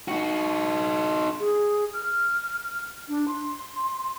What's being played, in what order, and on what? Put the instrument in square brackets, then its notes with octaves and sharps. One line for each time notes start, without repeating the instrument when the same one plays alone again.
[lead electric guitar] D#4 F#4
[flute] G#4
F6
D4
C6